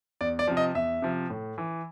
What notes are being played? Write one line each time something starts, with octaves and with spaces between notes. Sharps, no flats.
E2 D5
D5
C3 F3
D#5
E2 E5
C3 F3
A2
E3